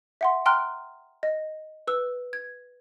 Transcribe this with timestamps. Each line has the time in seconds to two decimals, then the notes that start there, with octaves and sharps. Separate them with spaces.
0.21 E5 F#5 C6
0.46 G5 A#5 C6 F6 F#6
1.23 D#5
1.87 B4 E6
2.33 G#6